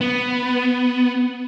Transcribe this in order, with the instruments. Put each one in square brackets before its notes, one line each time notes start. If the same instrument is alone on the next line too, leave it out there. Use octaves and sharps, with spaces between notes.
[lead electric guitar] B3